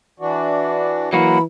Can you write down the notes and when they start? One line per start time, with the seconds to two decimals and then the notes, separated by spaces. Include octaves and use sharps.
0.20 E3 D4 F#4
1.13 E3 F#3 A#3 F#4 A#4 B5